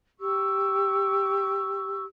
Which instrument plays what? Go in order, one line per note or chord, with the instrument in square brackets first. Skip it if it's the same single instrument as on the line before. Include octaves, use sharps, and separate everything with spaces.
[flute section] G4 C#6 E6